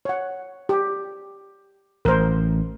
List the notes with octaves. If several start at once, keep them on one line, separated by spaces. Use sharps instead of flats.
C#5 F#5
G4
A1 A#4 C5